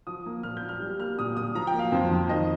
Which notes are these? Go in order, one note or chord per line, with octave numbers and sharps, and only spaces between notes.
F3 D#6
A#3
A#2 F6
G6
A#2
F6
G3
A#3 F6
A#2 D#6
A#2 D#6
F3 A#5
G5
A#3
F5
F2 C5
F2
D#3 D#5